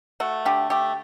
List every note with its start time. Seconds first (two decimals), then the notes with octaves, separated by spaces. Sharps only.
0.20 A3 F#4
0.45 D3 G4
0.70 A3 G4